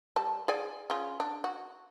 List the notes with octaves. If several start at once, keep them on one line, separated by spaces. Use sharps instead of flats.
G3 A5
G#4 D5 G#5
C#3 F4
D4
F#4